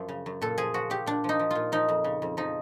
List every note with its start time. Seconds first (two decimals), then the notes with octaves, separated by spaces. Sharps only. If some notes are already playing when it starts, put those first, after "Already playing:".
Already playing: F#2 F3
0.08 C#3
0.26 F#2
0.42 A#2 A4
0.57 F3 G#4
0.74 F3 F#4
0.90 A#2 G4
1.06 A#2 D4
1.24 F3 D#4
1.39 F3
1.51 A#2 F4
1.72 F3 D#4
1.89 F2
2.04 C#3
2.22 F2
2.37 F3 D#4